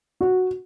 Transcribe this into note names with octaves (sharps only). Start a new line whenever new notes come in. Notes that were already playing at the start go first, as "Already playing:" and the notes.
F#4